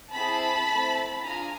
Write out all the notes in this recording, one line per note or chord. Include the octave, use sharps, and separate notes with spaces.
C4 E4 G#4 A5 B5
A3 C4 E4
D4 F4 G#4 G#5 A#5